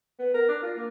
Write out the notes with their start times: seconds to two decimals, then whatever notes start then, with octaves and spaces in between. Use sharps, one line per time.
0.19 B3
0.34 A#4
0.48 D4
0.62 F4
0.76 A#3